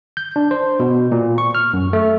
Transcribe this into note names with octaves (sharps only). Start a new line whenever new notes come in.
G6
D4
C5
B2
A#2
C#6
F6
F#2
A3